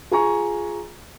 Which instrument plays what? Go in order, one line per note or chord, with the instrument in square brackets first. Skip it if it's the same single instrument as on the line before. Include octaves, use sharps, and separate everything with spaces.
[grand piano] F4 G#4 G#5 A#5 C#6